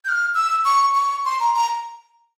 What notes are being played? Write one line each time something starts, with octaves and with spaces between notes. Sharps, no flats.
G6
F6
E6
C#6
C#6
C6
A#5
A#5